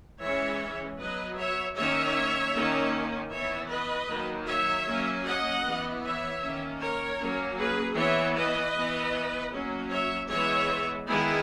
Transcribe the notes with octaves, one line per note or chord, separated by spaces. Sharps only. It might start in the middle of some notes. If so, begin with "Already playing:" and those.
E3 G#3 C#4 C#5 E5
F#3 B3 B4 D#5
C#5 E5
D#3 A#3 C#4 C#5 E5
D#3 A#3 C#4
E3 B3 C#5 E5
B4 D#5
D#3 F#3 A#3
C#5 E5
F#3 A#3 C#4
D#5 F#5
E3 B3
C#5 E5
D#3 A#3 C#4
A#4 C#5
F#3 A#3 C#4
G#4 B4
E3 B3 C#5 E5
B4 D#5
E3 B3
F#3 A#3 C#4
C#5 E5
E3 G#3 B3 C#5 E5
D#3 G#3 B3 E4 G#4